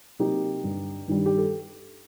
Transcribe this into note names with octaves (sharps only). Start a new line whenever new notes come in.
C3 F#3 A#3 D#4 G4
G2 D3 G3
G2 D#3 G3
G4
A4